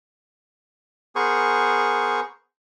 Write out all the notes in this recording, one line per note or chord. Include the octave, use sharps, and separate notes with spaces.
B3 G#4 A#4 C5 C#6